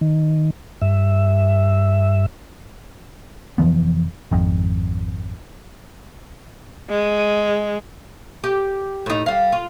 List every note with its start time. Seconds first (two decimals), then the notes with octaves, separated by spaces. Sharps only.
0.01 D#3
0.82 G2 E5
3.58 F1 E3 F3 B3
4.31 G#1 F2
6.90 G#3
8.44 G4
9.06 A2 D#4
9.26 G3 F5
9.52 F4